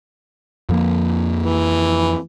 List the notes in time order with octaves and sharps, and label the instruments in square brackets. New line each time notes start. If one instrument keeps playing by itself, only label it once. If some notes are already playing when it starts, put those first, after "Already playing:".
[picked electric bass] F2 F3 A#3
[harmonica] E3